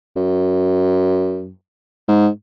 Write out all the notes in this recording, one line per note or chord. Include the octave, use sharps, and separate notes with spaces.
F#2
G#2